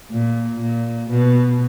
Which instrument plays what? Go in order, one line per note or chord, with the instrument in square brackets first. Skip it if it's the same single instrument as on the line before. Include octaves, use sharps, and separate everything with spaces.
[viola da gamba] A#2
A#2
B2